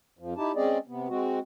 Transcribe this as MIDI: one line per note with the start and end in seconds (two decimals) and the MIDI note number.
0.19 0.34 41
0.19 0.34 53
0.37 0.52 63
0.37 0.52 64
0.37 0.52 67
0.37 0.52 81
0.56 0.78 56
0.56 0.78 60
0.56 0.78 61
0.56 0.78 68
0.56 0.78 74
0.56 0.78 75
0.88 1.08 48
0.88 1.08 59
1.08 1.39 56
1.08 1.39 60
1.08 1.39 66